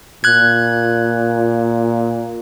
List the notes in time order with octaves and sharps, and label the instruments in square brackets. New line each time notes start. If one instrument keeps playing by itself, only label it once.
[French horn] A#2 [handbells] F#6 G#6